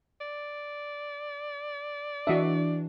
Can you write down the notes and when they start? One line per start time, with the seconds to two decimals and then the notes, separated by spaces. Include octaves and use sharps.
0.21 D5
2.27 E3 D4 F#4 D#5 E5